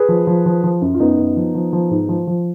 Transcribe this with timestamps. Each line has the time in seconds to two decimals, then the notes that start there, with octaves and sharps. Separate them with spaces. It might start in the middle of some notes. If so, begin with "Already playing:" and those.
Already playing: G#4 B4
0.09 F3
0.27 F3
0.46 F3
0.64 F3
0.82 F#2
0.94 F4
1.00 F#2 B3 D#4
1.18 F#2
1.36 F3
1.55 F3
1.73 F3
1.91 G#2
2.09 F3
2.27 F3